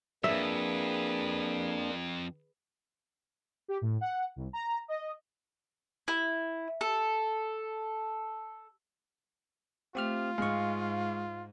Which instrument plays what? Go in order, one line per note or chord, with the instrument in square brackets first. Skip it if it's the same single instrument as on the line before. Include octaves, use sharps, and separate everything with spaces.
[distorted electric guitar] F2 G#2 [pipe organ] A#3 D4 [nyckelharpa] G#4 B4 [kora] E5
[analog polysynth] G4
A2
F#5
C2
A#5
D#5
[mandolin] E4
A4
[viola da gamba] A3 [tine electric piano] C4 G4 F6 [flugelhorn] F4
[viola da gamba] G#2 [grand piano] G#3 [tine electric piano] F5 C#6